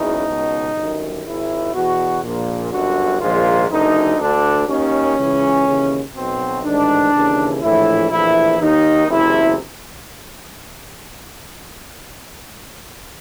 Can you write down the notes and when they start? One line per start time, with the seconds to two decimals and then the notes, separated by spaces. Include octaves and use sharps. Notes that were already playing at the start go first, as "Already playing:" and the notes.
Already playing: F#1 E2 C#3 E3 D#4
0.27 C#2 B2
0.75 G1 F#2 D#3
1.25 G#1 G#2 D#3 E4
1.74 E2 B2 F#4
2.22 A#1 A#2
2.72 G1 F#2 D3 F#4
3.20 A#1 G#2 D#3 F4
3.69 F#1 F#2 D3 D#4
4.18 D2 D3 D4
4.68 D#2 D#3 C#4
5.17 C#2 C#3 E3
5.66 D#2 C#3 E3
6.15 B1 B2 C4
6.63 A1 G#2 D#3 D4
7.13 D#2 C#3 E3
7.62 A#1 A2 E3 E4
8.11 A#1 A2 E3 E4
8.60 D#2 D#3 D#4
9.08 F#1 E2 C3 E4